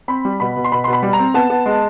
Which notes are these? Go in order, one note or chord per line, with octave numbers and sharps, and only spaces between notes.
C4 B5
G3
B2 B5
B2
C6
B2 B5
B2 C6
B5
G3
A#5
C4
B3 A5
B3
G#3